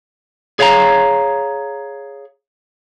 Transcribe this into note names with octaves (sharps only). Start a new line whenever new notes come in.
G#4 C#5 F5 F#5 A#5